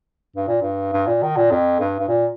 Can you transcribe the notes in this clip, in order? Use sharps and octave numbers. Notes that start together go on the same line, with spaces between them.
G2
A#2
G2
G2
A#2
D#3
A#2
F2
G2
G2
A#2